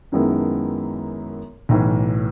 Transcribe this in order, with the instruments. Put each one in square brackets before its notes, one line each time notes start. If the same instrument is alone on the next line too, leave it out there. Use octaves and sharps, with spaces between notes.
[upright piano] F#2 D#3 G#3 B3 E4
B1 A2 E3